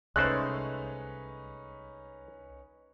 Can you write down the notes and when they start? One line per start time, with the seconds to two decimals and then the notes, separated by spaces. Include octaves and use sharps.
0.16 C2 G#3 A3 C#4 D#4 B4 C5 F#6